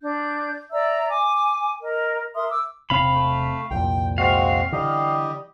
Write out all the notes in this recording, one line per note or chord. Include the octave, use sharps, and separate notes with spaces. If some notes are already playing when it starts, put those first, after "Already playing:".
D4 G6
D5 E5 A#5 E6
G#5 D6
A#4 D#5
A#4 E5 C6 D#6
D6 E6
E1 C3 C4 F5 B5
A3
C2 F2 A#2 G5
G#3 C4 F#4 F5
D3 E3 G3 G4 D#5